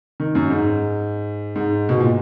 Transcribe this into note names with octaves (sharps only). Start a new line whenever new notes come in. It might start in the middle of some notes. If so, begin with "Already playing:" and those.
D#3
F#2
G#2
G#2
B2
A#2